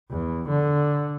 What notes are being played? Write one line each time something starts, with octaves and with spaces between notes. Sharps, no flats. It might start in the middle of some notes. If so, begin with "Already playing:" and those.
E2
D3